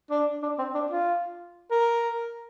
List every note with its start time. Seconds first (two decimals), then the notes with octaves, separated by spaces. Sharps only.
0.10 D4
0.42 D4
0.59 C4
0.74 D4
0.91 F4
1.71 A#4